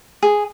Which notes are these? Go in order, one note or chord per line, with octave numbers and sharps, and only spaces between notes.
G#4